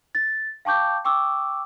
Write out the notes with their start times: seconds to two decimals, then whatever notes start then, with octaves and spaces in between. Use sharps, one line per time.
0.15 A6
0.65 F5 G5 A5 C#6 D6 G6
1.05 G5 C#6 D6 E6